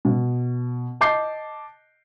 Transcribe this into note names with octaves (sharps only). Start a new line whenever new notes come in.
B2
D#5 A5 D6 G6 C7